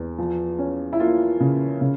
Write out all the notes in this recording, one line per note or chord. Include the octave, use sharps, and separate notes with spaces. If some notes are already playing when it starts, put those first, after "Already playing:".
Already playing: E2
F3
C#4
E4
A#3 F4
C#3
C#3